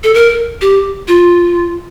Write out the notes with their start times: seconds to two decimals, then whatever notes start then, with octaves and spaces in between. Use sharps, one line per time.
0.04 A4
0.14 A#4
0.61 G4
1.08 F4